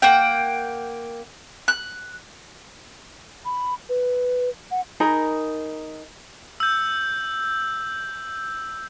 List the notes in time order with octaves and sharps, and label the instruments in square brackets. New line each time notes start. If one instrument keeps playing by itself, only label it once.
[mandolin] A#3 F#5 G5
F#6
[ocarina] B5
B4
F#5
[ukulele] D#4 G#4 A#4 B5
[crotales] E6 G6